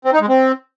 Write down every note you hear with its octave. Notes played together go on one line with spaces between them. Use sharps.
C4
D#4
G#3
C4